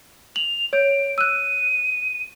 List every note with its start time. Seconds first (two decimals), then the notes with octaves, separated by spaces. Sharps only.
0.36 F7 F#7
0.73 C#5 G6 D7
1.18 E6 F#6 D#7